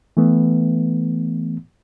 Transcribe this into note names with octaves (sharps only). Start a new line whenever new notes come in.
E3 A3 B3